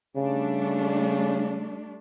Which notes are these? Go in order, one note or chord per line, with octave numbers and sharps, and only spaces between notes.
C#3 G3 A3 D4